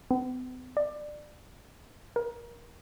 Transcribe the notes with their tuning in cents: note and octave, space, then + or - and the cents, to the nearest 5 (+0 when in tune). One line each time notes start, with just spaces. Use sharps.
B3 +45
D5 +20
A#4 +25